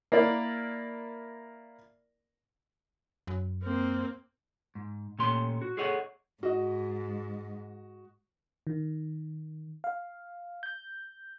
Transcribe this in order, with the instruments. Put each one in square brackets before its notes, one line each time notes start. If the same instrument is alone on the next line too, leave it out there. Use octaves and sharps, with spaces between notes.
[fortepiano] A#3 E4 A#4 D5
[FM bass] F#2
[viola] A#3 C4
[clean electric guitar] G#2
A#2 A3 C#4 G4 C6
F#4
G#4 A4 C#5 D#5 F#5
[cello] G#2 [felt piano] F#4 D#5
[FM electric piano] D#3
F5
G6